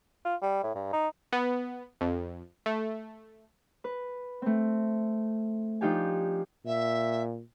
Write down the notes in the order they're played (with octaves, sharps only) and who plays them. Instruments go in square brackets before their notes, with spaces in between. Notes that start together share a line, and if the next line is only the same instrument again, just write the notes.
[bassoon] F4
G3
A2
G2
D#4
[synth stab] B3
F2
A3
[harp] B4
A3 C4
F3 D4 D#4 F4 G4 G#5
[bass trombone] A#2 [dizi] E5